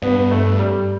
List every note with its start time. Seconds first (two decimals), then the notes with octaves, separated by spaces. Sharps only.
0.02 G2 B3
0.31 A3
0.59 G3